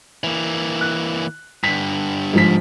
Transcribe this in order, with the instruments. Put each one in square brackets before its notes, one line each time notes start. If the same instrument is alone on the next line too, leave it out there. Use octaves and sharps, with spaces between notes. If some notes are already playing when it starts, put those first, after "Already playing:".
[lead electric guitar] E3 A#3
[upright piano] F#6
[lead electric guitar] G2 D3 [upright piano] B6
[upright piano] G#2 F3 B6